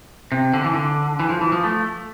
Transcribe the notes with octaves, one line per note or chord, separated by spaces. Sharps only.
C3
D3
E3
D3
E3
F3
E3
F3
A3